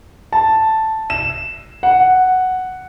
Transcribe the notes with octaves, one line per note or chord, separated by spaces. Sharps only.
A5
E7
F#5